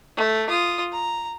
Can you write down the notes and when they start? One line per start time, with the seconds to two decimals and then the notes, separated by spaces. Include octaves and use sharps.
0.17 A3
0.49 F4 D#6
0.92 A#5